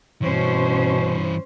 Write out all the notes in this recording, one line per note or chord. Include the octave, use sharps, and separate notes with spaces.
G2 B2 E3 C#4 C5